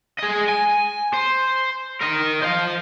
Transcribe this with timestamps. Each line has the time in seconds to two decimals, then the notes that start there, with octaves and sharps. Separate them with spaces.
0.18 G#4 D#5
0.49 G#5
1.13 C5
2.01 A#4 D#5
2.42 C5 F5